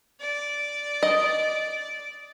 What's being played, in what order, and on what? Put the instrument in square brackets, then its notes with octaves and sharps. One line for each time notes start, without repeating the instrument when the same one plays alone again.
[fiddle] D5
[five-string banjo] D#5